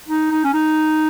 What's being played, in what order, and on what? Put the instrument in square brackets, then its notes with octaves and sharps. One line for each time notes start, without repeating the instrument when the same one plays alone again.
[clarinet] D#4
D#4
C#4
D#4